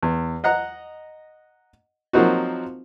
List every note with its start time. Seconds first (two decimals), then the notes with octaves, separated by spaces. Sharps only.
0.03 E2
0.44 D#5 F#5 A#5 F#6
2.13 F3 F#3 A#3 C4 D#4 F#4